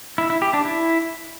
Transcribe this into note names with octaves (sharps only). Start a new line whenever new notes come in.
E4
E4
G4
D4
E4